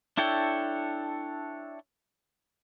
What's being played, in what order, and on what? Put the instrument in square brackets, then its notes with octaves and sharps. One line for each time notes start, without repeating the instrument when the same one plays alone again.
[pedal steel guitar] D4 E4 A4 C#5 G5